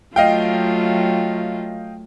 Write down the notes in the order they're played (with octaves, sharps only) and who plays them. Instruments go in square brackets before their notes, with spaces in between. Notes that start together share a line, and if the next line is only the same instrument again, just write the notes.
[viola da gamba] F#3 A3 F4 [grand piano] D#5 F5 G5